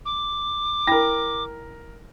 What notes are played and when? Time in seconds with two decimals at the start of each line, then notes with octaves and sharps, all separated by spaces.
0.06 D6
0.87 E4 A#4 G5 B5 A#6